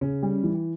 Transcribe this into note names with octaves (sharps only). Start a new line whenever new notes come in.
C#3 C#4
G3
E3